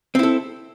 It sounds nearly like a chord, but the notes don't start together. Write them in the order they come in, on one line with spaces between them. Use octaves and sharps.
C4 E4 A4